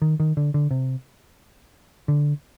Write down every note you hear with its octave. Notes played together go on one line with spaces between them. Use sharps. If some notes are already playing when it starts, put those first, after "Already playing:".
D#3
D#3
D3
D3
C3
D3